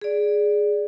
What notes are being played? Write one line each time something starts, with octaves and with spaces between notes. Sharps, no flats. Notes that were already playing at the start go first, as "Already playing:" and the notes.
G#4 D5